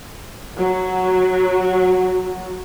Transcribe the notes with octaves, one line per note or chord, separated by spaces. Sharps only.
F#3 F#4